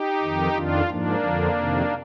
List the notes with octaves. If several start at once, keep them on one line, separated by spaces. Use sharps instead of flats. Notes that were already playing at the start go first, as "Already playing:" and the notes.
Already playing: D#4 G4
F2 D#3
F2 D#3 D4 F4
G#2 F3 A#3 D4
F2 D3 F3
F2 C3 D#3